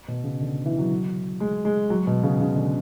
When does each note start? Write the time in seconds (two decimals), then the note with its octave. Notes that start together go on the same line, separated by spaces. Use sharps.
0.08 B2
0.24 C#3
0.41 D3
0.66 E3
0.78 F#3
1.40 G#3
1.65 G#3
1.90 F#3
2.07 B2
2.23 C#3
2.40 C#3
2.56 D3